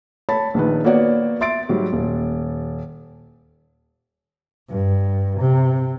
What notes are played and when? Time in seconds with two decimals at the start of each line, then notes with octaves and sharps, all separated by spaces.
0.29 C#5 A5 B5 A6
0.54 A#1 D#3 B4
0.85 A#3 B3 F#4 C#5 D5 F#5
1.41 E5 C6 A6 D7
1.69 G#2 F#3 G3
1.93 D#1
4.69 G2
5.40 C3